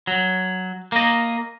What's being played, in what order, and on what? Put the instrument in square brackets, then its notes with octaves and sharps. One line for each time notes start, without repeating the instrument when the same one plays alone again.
[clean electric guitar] F#3
A#3 D#5